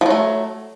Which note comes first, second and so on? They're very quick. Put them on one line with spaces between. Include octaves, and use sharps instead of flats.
F3 F#3 A3